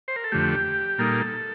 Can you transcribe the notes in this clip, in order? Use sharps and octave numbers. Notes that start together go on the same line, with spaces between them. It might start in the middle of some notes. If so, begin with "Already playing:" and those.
C5
A#4
A4
F2 D3 A3 G4
A#2 G3 A#3 D#4 A4